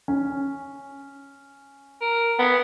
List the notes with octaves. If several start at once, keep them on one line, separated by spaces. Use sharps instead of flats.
C#4
A#4
B3